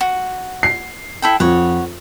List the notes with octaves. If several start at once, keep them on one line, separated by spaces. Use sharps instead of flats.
F#4
C7
E4 A4 G5
F2 C#5 F#5